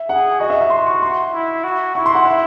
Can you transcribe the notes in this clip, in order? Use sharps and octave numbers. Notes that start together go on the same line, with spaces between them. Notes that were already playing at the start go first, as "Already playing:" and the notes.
Already playing: E5
G#4 F#5
F#4 D#5
E5
E5
C6
C#6
C6
E4
F#4
E4 C#6
C6
F#5
E5